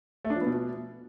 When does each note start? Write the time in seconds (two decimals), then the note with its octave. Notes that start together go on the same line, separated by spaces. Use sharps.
0.25 A3
0.30 D4
0.36 F3
0.41 B3
0.47 B2